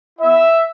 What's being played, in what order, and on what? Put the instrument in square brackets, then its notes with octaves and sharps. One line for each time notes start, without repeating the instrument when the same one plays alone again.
[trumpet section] B3 E4 E5